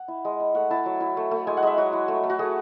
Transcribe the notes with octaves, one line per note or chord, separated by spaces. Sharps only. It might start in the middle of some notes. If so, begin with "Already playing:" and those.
Already playing: F#5
E4
G#3
E4
A3 F#5
E4 A5
F#3
E4
A3
A3
G#3 G#5
F#5
G#3 E5
F#3 F#4
E4
A3
A3
F#4
A3 G#4